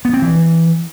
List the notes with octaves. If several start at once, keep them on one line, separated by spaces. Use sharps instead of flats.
B3
C4
E3